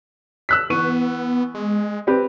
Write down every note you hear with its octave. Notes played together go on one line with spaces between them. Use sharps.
E6 F#6 B6
E3 B3 C#6 D#7
G#3
C4 G4 B4